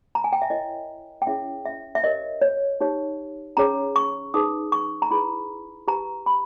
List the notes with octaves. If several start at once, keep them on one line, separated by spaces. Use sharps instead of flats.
A#5
G#5
G5
E5
E4 A#4 C#5 D#5
G5
C#4 E4 G#4 C#5 E5
E5
E5
G4 A#4 C#5 D#5
C#5
D#4 G4 C#5
C#4 G#4 C#5 A#5
C#6
D#4 G#4 B4 D#6
C#6
A#5
E4 G#4 B4 B5
G4 B4 A#5
B5